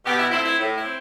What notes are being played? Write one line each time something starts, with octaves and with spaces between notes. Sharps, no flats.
B2 G4
E4
A3 C4 E4
E4
A2
E4
C4